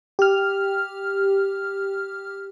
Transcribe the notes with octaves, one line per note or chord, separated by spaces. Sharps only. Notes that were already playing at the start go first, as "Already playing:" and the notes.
G4 F6